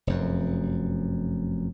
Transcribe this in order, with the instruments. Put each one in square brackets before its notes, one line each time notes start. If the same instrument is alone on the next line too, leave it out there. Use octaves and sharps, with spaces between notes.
[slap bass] F1 F#2